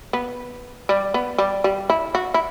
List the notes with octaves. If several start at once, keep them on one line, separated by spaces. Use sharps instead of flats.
B3
G3
B3
G3
G3
E4
F#4
E4